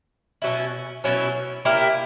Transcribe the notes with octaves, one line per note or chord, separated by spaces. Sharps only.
B2 F#3 C#4 E4
B2 F#3 C#4 E4
A#3 E4 G4 A#4